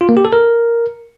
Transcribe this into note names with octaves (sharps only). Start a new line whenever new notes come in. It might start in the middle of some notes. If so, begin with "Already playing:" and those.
F4
A#3
G4
A4
A#4